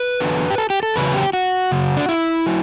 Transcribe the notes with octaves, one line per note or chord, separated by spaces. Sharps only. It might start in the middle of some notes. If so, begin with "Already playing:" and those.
Already playing: B4
E2 D3 F#3
G4
A4
G4
A4
E2 C#3 F#3 B4
G4
F#4
F#2 C#3
D4
E4
F#3